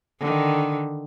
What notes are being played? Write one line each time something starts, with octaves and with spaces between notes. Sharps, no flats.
D3 D#3